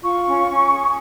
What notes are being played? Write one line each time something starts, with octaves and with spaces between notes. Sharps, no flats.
F4 C#6
C#4
C#4
G#4